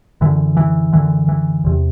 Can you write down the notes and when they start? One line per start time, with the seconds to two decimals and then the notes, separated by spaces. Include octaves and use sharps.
0.21 F#2 D3 E3
0.57 E3
0.92 F#2 D3 E3
1.29 E3
1.64 E2 C3